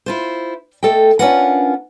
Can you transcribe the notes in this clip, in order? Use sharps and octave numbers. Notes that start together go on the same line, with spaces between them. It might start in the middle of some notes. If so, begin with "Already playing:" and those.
E4 F4 C5
A3 A4 D#5 G5
C#4 D4 F4 A#4 B4 F#5